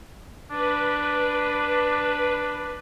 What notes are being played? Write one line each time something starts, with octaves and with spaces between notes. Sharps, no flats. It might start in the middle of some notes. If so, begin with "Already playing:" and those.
D4 B4